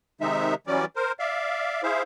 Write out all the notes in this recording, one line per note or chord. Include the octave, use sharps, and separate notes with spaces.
C3 D#3 G#3 D#4 E5
E3 F#3 G3 C#4 D5
A#4 C5
D5 E5 F5
E4 G#4 C5 E5 F5